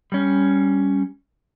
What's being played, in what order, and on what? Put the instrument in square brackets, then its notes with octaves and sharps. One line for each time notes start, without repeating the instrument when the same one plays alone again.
[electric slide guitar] G3 C#4